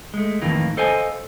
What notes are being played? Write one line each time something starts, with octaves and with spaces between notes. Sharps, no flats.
G#3 A3
F2 A2 D#3 E3 A#3
A4 C5 D#5 F5 G#5